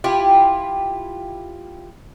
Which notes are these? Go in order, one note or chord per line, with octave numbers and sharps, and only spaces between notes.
E4 F4 G4